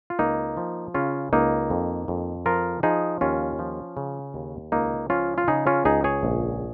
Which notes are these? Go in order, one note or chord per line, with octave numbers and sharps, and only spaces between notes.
F4
C#2 A#3 D#4
F3
C#3 C#4 F4
C#2 A#3 D#4
F2
F2
F3 F4 A#4
F3 D#4 G#4
D#2 C#4 F4
F3
C#3
D#2
C#2 A#3 D#4
F3 C#4 F4
F4
C#3 D#4 G#4
C#4 F4
C#2 D#4 G#4
G#4 C#5
A#1